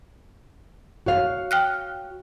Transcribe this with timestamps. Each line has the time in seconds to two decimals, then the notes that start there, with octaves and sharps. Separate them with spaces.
1.06 F#4 C#5 F5
1.51 G5 F6 F#6